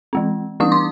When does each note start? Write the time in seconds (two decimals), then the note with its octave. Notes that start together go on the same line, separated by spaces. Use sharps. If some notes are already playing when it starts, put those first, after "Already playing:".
0.13 E3 G#3 C4
0.60 E3 G3 B3 D4 C#6 D#6
0.72 C6 D6